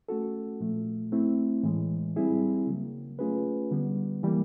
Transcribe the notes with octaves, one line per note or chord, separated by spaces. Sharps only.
A3 C#4 F#4 A4
A#2 F3 A3
A3 C4 E4
A2 E3 G#3
G3 C4 E4 G#4
C#3 F#3 A#3
A3 C#4 F4 G#4 B4
D3 G3 B3
E3 G3 A#3